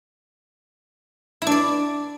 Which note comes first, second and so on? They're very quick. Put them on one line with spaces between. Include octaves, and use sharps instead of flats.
E4 D4 D5